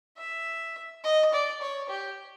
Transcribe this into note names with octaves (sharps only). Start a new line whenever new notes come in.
E5
D#5
D5
C#5
G4